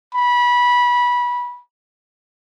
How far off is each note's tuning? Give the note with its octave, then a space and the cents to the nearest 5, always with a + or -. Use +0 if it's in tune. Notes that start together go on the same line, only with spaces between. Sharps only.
B5 -20